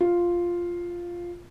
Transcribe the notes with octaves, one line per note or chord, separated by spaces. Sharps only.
F4